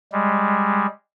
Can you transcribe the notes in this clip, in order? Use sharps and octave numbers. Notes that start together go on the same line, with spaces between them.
G3 G#3